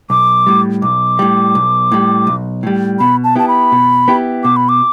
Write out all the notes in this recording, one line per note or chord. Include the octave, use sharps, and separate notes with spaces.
B1 D6
A2 G3
B1 D6
A2 G3
B1
A2 G3
B1
A2 G3
B2 B5
A5
B3 E4 G4 A5
B5
B2
B3 E4 G4
B2 D6
B5
D6